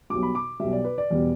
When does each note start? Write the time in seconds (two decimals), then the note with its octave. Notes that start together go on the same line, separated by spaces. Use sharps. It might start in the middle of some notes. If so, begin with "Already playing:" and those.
0.10 B1 B2 G3 D6
0.23 B5
0.35 D6
0.60 B1 B2 G3 E5
0.73 D5
0.84 B4
0.98 D5
1.10 E2 B2 G3